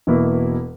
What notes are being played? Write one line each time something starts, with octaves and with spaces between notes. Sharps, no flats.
E1 E2 B2 A#3 E4